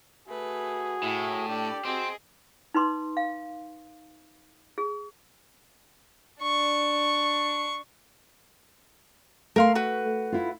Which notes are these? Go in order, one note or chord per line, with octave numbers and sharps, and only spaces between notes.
A3 F#4 G#4 B4
A2 E4
D4 G4 A4 D5
C4 F#4 G#4 D#5
D#4 B4 C6 D6
F5
G#4
D4 C#6
A3 A#4 F5 C6
F#4 B4
E4 F4